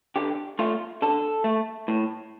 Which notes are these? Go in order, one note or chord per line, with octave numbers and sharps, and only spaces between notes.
D3 G4
A3 F4
D3 A4
A3
A2